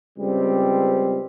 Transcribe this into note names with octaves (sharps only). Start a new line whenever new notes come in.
C#2 G3 C4